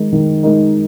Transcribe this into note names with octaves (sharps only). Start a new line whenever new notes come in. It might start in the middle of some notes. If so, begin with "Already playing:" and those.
Already playing: D#3 G#3 D#4 A#4
D#3
G#3 D#4 A#4